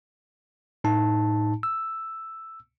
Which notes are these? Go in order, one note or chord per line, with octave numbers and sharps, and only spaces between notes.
A2 D#4 A5
E6